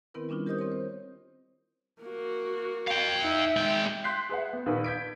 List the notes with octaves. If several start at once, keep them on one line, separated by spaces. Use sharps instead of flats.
D#3 B3 C4 E4 A#4 B4
G3 C#4 D4 E4 F4
G4 A#4 C5 D#5 D#6 G6
C4 A#4 C#5
C5
A#3 F#4
F5 G5
D#4 E5
G#3 G5
C6 F#6 G6 B6 C7
G#4 B4 E5 F#5
B3
A#1 D#3 B4
G6 G#6 B6 D7